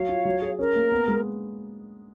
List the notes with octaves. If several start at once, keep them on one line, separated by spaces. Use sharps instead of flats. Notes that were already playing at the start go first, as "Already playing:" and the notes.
Already playing: F#3 C#5 F5
F4
F#3
G#4
C#4 A#4
A#3
B3
G#3